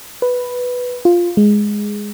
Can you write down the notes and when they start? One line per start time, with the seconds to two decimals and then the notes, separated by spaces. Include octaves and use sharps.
0.22 B4
1.05 F4
1.37 G#3